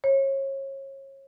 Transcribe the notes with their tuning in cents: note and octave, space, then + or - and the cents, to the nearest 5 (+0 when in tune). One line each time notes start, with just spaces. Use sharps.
C#5 -30